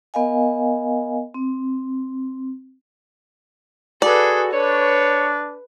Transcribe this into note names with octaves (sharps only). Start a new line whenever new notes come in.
B3 A#4 D#5 F5 G#5
C4
F#4 G#4 A4 B4 D5
D4 B4 C#5